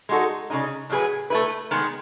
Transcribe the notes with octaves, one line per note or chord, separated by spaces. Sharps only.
G#3 D#4 F#4 A4
C#3 G#3 D#4
A2 F#3 C#4 G#4 B4
A3 E4 B4
D#3 G#3 B3